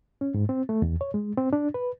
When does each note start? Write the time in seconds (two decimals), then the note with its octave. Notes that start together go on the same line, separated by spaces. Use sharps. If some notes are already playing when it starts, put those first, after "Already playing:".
0.21 C#4
0.34 G#2
0.49 C4
0.69 A3
0.82 E2
1.01 C#5
1.14 G#3
1.37 C4
1.53 D4
1.74 B4